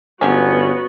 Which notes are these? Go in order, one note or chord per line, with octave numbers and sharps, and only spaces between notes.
G1 F3 F#3 B3 C#4 F#4